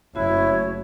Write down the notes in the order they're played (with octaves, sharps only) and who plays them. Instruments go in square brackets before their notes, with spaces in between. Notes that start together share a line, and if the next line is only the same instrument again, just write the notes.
[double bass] F#1 [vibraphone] A3 C#4 F#4 [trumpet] E4 [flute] C#5